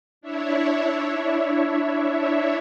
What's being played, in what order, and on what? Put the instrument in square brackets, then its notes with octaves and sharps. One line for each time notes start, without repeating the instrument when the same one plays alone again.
[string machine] D4 E4 C#5 E5